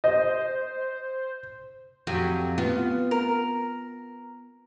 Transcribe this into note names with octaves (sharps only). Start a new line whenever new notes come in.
C5 D#5
F2 F#3 G4 G#5
B3 F4
A#4